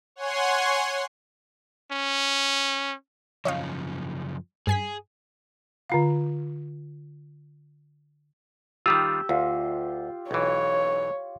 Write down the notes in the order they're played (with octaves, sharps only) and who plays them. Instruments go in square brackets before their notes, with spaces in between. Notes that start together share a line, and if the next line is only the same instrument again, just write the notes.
[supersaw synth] C#5 F#5 G#5 C6
[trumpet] C#4
[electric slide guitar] F#2 C#3 F3 [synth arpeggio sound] C#5 D#5 F5
[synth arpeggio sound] G2 G#5 B6 [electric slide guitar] G#4
[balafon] D3 F4 F5
[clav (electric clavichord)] D#3 G3 F4 [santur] G4 [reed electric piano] E6
[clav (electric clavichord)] D2 [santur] F4
[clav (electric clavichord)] B1 E3 [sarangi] C#5